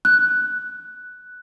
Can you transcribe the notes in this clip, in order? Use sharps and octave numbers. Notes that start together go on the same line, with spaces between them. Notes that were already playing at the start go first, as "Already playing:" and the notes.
F#6